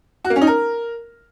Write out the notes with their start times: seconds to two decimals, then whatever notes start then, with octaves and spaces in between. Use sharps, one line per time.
0.25 F#4
0.30 A#3
0.36 C#4
0.41 D#4
0.47 A#4